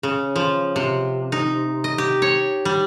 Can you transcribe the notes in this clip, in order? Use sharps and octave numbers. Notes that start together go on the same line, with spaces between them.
C#3
F3
C3
D#4
D#5
G4
C#5
G3